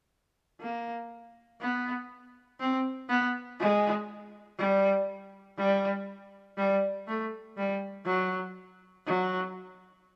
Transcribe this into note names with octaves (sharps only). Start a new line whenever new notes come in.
A#3
B3
C4
B3
G#3
G3
G3
G3
A3
G3
F#3
F#3